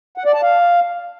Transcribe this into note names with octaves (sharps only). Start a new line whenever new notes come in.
F#5
D5
A5
F5